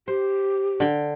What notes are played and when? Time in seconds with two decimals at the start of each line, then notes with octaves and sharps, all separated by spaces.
0.08 G4 C5
0.80 D3 G5